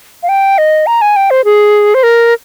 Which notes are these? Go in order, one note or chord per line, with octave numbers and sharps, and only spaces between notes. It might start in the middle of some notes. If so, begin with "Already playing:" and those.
F5
G5
D#5
A#5
G#5
G5
C5
G#4
C5
A#4